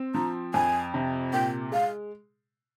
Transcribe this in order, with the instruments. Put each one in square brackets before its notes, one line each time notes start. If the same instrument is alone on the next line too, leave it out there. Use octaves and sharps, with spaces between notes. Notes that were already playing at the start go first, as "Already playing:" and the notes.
Already playing: [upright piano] C4
[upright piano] F3 [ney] A#5
[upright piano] F2 [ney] G#5
[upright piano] C3
[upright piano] A#2 [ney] G5
[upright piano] G#3 [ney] F5